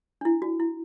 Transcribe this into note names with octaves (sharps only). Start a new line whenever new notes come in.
D4
E4
F#4
E4